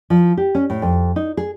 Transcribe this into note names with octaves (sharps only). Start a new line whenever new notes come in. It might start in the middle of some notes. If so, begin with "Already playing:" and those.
F3
G4
C#4
A2
F2
D#4
G#4